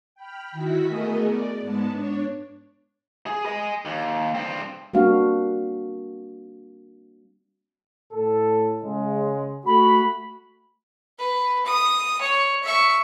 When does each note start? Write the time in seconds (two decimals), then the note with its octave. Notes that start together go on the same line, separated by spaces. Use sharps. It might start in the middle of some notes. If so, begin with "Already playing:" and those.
0.15 G5 B5 F6
0.52 D#3 E4 F#4 E5 B6
0.85 A3 B3 G#4 A#4 D#5
1.27 D5 D6
1.61 G#2 G#3 B3 A5
1.92 D4 C#5
3.26 G#4
3.46 D#5 G#5
3.85 D#2
4.35 G2 C4
4.93 G3 A#3 C4 D4 F#4 F5
8.13 A2 A4
8.83 C#3 G#3
9.66 A3 F#4 B5
11.18 B4
11.66 D#6
12.21 C#5
12.64 E5 C#6